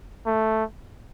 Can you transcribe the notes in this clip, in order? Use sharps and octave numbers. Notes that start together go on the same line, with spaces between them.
A3